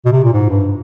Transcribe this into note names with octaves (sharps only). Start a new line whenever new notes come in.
B2
C3
A#2
G#2
G2